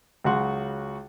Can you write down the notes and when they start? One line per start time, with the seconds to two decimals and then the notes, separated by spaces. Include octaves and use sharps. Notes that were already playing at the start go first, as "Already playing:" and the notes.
0.24 C#2 C#3 F#3 F#4 F#5 C6